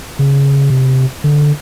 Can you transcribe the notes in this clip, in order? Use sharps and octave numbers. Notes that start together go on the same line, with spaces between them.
C#3
C3
D3